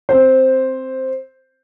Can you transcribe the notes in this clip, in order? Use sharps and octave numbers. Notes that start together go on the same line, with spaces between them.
C4 C5